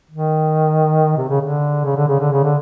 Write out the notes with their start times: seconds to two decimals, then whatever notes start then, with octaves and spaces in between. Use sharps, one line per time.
0.11 D#3
1.18 C3
1.29 C#3
1.41 D3
1.85 C#3
1.96 D3
2.08 C#3
2.19 D3
2.32 C#3
2.44 D3